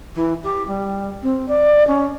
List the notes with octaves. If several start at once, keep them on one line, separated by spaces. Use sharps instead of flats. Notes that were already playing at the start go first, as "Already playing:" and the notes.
E3
G4
G3
C4
D5
C#4